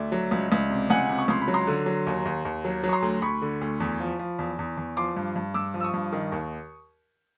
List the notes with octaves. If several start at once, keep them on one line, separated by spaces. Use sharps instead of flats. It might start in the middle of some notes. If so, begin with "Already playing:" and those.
Already playing: D2 D5 E5
F#3
C#2
C#2
C3
C#2 F#5 G#5
C3
C#6
C#2 C6
B5
F#3
A#5 C6
D3
F#3
D#2
D#2
D#2
F#3
F#3
C#6
A#5 C6
D2
D2 B5 C#6
D3
D2
E2
F3
F3
E2
E2
E2
F3 C6 D6
G2
G2
G2 D6 E6
F3
E6
C#6 D#6
G2
D#3
D#2